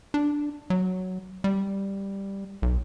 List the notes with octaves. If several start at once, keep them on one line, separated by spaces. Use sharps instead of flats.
D4
F#3
G3
B1